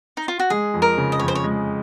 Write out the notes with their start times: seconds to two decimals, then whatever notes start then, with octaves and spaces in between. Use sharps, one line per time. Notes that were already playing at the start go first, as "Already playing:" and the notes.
0.17 D#4
0.28 F4
0.39 F#4
0.50 G#3 G#4
0.74 F2
0.82 A#4
0.98 C#3
1.12 D#5
1.19 F2 C#5
1.28 C5
1.35 C#5
1.44 G#3